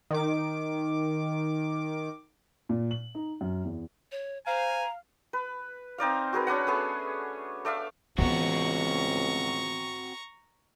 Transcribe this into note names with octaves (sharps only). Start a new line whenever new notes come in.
D#3 D6
A#2
F#7
D#4
F#2
E2
C#5
C5 F5 G#5 A#5
B4
C4 D#4 D5 F5
F#4 G#4 A#4 B4
C#4 D4 B4 F#5
A3 B3 G#4
A3 D5 E5 F5
C#2 E3 B3 C4 F#4 A#5 C#6